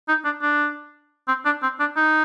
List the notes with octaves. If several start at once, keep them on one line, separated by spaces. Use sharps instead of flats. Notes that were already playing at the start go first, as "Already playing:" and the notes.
D#4
D4
D4
C4
D4
C4
D4
D#4